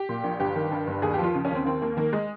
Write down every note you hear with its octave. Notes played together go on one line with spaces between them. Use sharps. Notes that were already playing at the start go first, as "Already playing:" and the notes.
Already playing: G4
A#2
A#1
G1 G4
D#3
G2
G1
D#2 G#4
F3 G4
F4
C#3
C#4
D#2 C4
D#3 C4
D#2 A#3
D#3 A#3
G#3